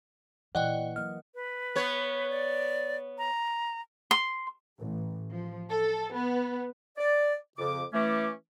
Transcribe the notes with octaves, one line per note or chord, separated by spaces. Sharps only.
A#2 E3 A#3 D5 D#5 F#5 G5
F#3 A#3 D#5 F6
B4
B3 C#5
D5
A#5
C6
A1
F3
A4
B3
D5
F2 C#3 D6
E3 A3 C#4 D6